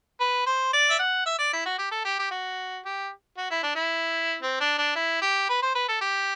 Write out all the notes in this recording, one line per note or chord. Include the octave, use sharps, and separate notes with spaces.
B4
C5
D5
E5
F#5
E5
D5
E4
F#4
G4
A4
G4
G4
F#4
G4
F#4
E4
D4
E4
C4
D4
D4
E4
G4
B4
C5
B4
A4
G4